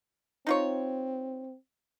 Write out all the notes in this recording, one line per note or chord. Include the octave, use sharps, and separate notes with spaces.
C4 D#4 F4 C#5